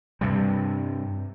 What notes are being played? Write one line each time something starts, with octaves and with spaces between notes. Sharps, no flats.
G2 C3 G3